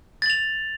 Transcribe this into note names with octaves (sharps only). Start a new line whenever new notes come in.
A6 F7 F#7